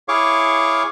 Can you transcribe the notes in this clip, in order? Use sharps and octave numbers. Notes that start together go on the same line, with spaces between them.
E4 G#4 C#5 F5 C#6 D6